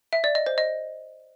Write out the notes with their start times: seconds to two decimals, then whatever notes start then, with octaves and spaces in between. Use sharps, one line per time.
0.13 E5
0.24 D5
0.35 D#5
0.46 C5
0.58 D#5